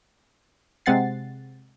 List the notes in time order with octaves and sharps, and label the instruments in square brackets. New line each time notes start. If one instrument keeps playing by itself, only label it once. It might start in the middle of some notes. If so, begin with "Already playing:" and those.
[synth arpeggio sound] C3 G#3 C4 F#5 A6 C7